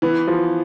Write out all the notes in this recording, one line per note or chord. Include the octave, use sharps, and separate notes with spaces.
E3 B3
F3